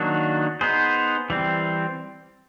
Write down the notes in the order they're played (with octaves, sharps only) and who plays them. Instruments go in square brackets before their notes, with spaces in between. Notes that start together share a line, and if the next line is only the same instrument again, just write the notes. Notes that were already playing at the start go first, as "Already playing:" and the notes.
Already playing: [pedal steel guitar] D#3 F#3 A#3 D4 F#4
B3 D#4 G#4 C5
E3 G3 C4